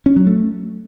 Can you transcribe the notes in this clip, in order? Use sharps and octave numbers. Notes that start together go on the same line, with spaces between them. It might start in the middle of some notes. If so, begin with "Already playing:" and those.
C#4
F#3
A3